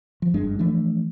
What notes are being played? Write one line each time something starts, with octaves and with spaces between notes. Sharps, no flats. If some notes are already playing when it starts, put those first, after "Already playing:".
F3
F#1 G2 G#3 D4
E3 F3 A3 D4